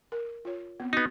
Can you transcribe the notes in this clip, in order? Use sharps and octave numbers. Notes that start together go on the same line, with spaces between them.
A#4
F4 C#5
B3 C4
B3 D#4 F#4